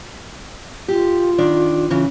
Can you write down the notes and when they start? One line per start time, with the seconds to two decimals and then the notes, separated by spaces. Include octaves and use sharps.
0.88 F4 G4
1.38 D#3 D4 D5
1.91 C#3 E3